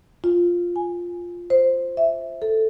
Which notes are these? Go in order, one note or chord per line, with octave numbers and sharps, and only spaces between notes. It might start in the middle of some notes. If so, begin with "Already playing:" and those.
F4
G#5
C5
E5
A4